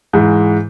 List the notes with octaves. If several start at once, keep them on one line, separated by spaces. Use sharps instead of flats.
G#2 E3 G#3